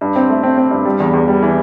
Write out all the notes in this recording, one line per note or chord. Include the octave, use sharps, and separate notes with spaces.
G2
C4
A3
C4
C4
G2
G3
E2
E2
G3
E3